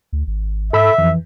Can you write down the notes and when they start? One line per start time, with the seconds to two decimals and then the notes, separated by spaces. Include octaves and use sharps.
0.13 D2
0.27 G#1
0.73 G#2 A4 E5 B5 E6
0.98 F2 E3